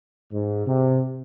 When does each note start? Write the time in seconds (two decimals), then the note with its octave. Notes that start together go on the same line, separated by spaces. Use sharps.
0.32 G#2
0.66 C3